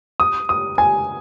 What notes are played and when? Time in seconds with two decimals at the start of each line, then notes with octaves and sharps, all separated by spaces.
0.20 D#6
0.49 D#6
0.78 G#5